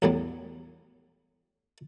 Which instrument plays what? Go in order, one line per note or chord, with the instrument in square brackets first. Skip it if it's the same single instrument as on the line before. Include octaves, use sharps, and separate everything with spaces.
[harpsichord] A1 E2 A2 E3 F#3 G3